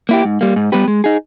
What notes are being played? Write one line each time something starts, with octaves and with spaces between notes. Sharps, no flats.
A#3 E4 G4
G#2
G3 A#3
G#2
G3 B3 G4 B4
G#3
D#4 G#4